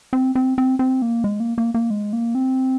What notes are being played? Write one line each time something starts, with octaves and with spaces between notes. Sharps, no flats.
C4
C4
C4
C4
A#3
G#3
A#3
A#3
A#3
G#3
A#3
C4